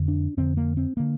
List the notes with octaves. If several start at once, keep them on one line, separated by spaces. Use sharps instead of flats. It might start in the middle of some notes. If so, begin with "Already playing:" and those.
Already playing: F2 D3
D4
F2 D3 C4
A#3
C4
D3 A#3